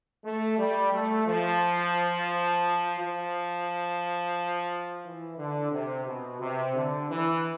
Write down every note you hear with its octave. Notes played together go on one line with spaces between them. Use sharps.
A3
G3
A3
F3
F3
E3
D3
C3
B2
C3
D3
E3